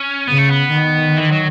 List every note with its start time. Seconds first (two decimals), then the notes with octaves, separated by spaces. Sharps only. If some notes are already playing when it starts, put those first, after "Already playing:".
Already playing: C#4
0.28 C#3 B3
0.38 A3
0.49 B3
0.73 D#3
1.17 E3
1.31 F#3